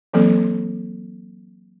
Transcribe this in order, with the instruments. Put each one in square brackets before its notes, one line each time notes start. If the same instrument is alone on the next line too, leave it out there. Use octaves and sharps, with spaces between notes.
[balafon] E3 F#3 A#3 C4 A4